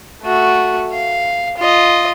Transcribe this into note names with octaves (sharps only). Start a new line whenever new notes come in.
A3 F#4
F5
F4 D#5